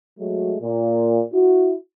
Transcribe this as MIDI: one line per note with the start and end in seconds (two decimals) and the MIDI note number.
0.20 0.55 54
0.20 0.55 56
0.20 0.55 57
0.20 0.55 66
0.61 1.22 46
1.33 1.74 64
1.33 1.74 66